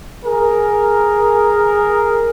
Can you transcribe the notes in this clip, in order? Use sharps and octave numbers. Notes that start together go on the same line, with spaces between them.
G#4 A#4